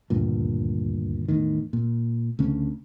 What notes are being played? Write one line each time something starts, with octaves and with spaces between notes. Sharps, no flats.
D#1 D2 G2 A#2
E2 A2 D#3
A#2
D2 C#3 C#4